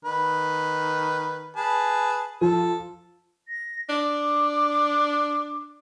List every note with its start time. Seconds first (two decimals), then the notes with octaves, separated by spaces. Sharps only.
0.05 D#3 B4
1.56 G#4 B4 A5
2.41 F3 A4
3.48 A#6
3.89 D4 D6